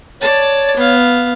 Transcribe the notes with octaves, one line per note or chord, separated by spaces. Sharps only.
C#5 D5 A5
B3 F5